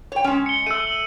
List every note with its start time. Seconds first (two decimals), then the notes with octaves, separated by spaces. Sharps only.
0.12 C#5 G5
0.24 G#3 C#4
0.46 C#7 G7
0.66 A3 E6 D#7
0.87 F#7